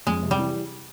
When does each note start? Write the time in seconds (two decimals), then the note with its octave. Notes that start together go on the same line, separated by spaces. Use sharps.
0.07 F2 G#3
0.23 C3
0.31 G3
0.38 E3